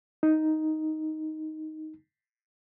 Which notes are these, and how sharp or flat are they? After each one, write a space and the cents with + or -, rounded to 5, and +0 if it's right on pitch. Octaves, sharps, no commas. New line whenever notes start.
D#4 +5